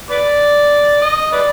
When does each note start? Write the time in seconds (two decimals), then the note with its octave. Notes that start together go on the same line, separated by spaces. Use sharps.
0.10 B4 D5
1.02 D#5
1.33 B4 D5